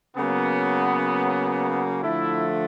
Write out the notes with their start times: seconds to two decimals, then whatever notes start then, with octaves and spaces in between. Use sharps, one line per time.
0.17 C#3 F#3 A#3 B3
2.03 D3 F3 A3 E4